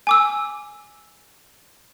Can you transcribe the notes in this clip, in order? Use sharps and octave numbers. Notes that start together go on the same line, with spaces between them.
G#5 D6 E6